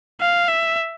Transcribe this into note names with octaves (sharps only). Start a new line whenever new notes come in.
F5
E5